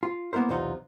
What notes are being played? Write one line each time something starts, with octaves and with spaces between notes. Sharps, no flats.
F4
A#3 B3 E4 A#4 C5
B1 E2 C3 D#4 F4 F#5